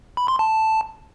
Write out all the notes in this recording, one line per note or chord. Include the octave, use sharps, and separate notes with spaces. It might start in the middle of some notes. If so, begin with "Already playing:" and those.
B5
C6
A5